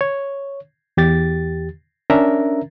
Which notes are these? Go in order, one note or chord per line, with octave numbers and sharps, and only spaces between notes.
C#5
E2 G4 A6
C#4 D4 A#4 E5 A#5